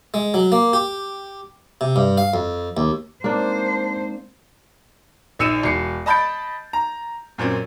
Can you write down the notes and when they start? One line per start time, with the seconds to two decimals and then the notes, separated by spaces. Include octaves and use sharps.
0.14 G#3
0.34 F#3
0.52 A#3
0.73 G4
1.81 C3
1.96 G2
2.18 F5
2.34 F2
2.77 D#2
3.24 G#3 A#3 C4 D4 D#4 C5 A5
5.39 A#1 D#4 E6 C#7 D#7 E7
5.63 E1 C7 C#7
6.06 D#5 A5 B5 G6 A6 D7
6.73 A#5
7.38 F#2 A#2 C4 C#4